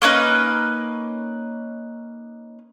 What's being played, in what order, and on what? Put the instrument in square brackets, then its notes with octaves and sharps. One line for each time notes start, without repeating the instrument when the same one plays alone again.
[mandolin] A#3 C#4 D#4 B4